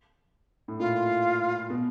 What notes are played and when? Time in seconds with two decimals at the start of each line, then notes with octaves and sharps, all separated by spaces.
0.68 A2
0.79 A#2 F4
1.70 B2